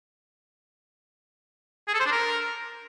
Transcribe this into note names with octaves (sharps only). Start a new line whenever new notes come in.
G#4
A4
C5
D4
A#4